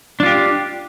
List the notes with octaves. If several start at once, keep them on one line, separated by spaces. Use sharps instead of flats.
D4 F4 G4